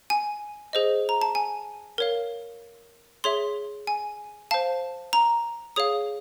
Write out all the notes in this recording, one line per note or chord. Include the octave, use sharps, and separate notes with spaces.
G#5
G#4 C5 D#5
A#5
A5
G#5
A#4 C#5 F5
G#4 C#5 E5 C6
G#5
C5 F5 A5
A#5
G#4 C#5 F5 D#6